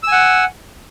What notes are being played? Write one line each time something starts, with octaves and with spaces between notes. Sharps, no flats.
F#5 G#5 E6